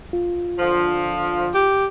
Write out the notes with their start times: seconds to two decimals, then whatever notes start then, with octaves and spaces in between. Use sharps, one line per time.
0.13 F4
0.59 D3 F3
1.54 G4